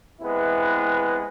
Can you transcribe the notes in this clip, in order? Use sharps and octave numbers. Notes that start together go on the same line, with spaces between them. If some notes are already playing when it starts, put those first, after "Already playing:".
C3 G#3 B3 E4 B4